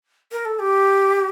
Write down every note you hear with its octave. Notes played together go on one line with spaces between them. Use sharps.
A#4
A4
G4